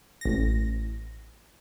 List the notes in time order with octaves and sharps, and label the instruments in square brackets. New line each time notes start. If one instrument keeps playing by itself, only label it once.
[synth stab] A1 A#6